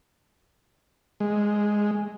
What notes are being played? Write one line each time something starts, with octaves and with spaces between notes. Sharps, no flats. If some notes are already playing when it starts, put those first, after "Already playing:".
G#3